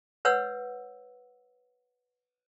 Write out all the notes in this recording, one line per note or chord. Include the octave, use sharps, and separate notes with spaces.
B4 C#5 F#5 E6